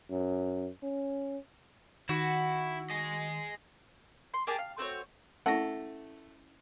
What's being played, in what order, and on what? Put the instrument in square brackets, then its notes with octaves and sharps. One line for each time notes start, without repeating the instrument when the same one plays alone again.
[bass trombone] F#2
C#4
[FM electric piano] D#3 [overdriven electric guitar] E4 [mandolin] F#4
[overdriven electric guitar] G#4 D#5
[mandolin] C6
A#3 G4 G#4 A5
F5
A3 C4 F#4 C#5
[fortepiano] A3 [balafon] C#4 E4 [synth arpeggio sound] F#5 A#6